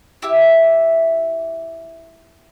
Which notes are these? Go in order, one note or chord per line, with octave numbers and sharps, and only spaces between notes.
E4 G4 E5